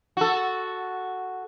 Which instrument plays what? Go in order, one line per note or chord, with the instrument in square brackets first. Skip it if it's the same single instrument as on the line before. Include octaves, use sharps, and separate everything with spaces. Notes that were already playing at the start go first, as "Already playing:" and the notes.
[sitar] F#4 A4